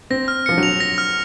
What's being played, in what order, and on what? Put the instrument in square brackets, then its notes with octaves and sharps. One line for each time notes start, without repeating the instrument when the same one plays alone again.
[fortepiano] C4 [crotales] A#6
[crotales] F6
[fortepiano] F3 [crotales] C#7
[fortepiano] F#3
[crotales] F7
A#6
F6